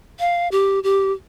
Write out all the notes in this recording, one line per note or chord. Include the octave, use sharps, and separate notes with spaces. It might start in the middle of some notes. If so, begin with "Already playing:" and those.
F5
G4
G4